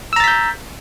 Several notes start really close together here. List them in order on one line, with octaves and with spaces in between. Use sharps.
E6 A#5 A6 B6 G6